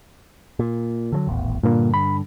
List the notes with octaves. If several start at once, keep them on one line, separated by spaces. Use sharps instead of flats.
A#2
D3 E3 F#3
D#1 A1 E2
G2 A#2 D3 A#3
B5